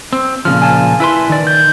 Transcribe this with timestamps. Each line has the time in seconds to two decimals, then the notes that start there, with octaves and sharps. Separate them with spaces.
0.13 C4
0.45 A#2 C#3 F3 F6
0.62 G#5 A5
1.00 E4 B4 C6
1.29 D#3 D5
1.47 G6